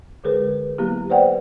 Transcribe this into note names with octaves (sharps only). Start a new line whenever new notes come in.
D3 G#3 G#4 A#4 B4
F#3 A#3 B3 E4 G4
B4 C5 D5 F#5 G5